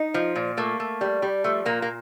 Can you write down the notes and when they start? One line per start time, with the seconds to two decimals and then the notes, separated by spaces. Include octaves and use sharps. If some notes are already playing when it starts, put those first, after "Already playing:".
Already playing: D#4
0.14 F3
0.36 A#2
0.57 A3 A#3
0.80 A3
1.01 G3
1.22 G3
1.44 F3 A3
1.66 A#2 A#3
1.82 A#3